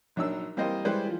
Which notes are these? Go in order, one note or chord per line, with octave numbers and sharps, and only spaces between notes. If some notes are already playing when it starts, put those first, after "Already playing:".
A#1 F#3 D4 D#4 A#4 E6
E3 G3 A#3 C4 C5 D#5
G3 G#3 E4 B4 C5 D5
E3 F3